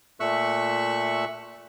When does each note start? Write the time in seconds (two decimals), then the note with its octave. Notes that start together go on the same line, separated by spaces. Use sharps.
0.20 A#2 A3 E5 C#6 E6 F#6